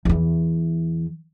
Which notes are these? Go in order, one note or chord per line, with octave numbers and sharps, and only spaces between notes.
E2 E3